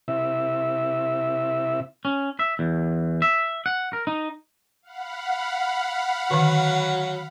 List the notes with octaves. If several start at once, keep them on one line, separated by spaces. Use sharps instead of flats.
C3 E4 E5
C#4
E5
E2
E5
F#5
A#4
D#4
F5 F#5 B5
D3 D#3 F#3